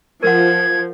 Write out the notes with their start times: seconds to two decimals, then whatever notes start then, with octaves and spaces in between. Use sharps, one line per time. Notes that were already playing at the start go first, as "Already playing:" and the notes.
0.23 F3 A#4 F#5 G#6